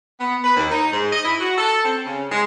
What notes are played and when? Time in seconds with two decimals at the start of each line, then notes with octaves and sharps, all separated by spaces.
0.20 B3
0.44 B4
0.57 D#2
0.71 D#4
0.92 G#2
1.12 D#5
1.25 E4
1.40 F#4
1.58 A4
1.84 C4
2.06 C#3
2.32 G#3